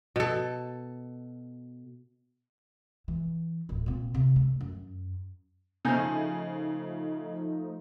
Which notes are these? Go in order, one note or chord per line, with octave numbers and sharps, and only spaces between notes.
B2 A4
E3
D1 A1
A#2 C4
C3 D#3
A3
F#2
C#3 F3 A3 D#4 G#5 G6